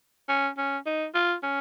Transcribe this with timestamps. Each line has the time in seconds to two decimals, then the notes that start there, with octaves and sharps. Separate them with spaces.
0.29 C#4
0.58 C#4
0.86 D#4
1.14 F4
1.43 C#4